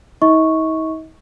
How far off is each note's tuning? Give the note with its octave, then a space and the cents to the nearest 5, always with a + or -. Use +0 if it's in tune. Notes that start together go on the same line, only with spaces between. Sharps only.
D#4 +45 D#5 +40 C#6 +0